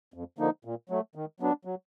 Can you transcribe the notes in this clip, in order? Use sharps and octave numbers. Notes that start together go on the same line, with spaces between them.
F2
D3 F3 A#3 D#4
A#2
F#3 A3
D#3
F#3 B3 D4
F#3